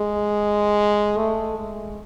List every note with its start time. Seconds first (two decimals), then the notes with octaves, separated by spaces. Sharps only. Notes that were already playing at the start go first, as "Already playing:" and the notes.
Already playing: G#3
1.17 A3
1.57 G#3